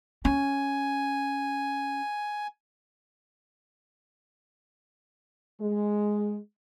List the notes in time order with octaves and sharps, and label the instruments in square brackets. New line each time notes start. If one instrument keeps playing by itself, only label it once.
[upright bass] C#4 [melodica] G#5
[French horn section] G#3